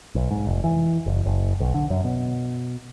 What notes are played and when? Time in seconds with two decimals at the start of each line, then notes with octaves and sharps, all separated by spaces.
0.15 B1
0.31 G#2
0.47 F1
0.64 E3
1.06 F#1
1.26 F#1
1.60 B1
1.74 D3
1.90 F#2
2.04 B2